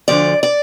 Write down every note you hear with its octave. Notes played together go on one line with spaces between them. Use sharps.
D2 D3 F3 D5
D5